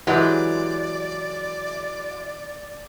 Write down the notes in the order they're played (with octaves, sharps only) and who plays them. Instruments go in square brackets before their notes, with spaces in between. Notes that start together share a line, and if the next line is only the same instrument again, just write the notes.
[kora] E3 G4 [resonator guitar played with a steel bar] F#3 G#3 [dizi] D5